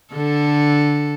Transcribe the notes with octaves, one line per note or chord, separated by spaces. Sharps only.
D3 A4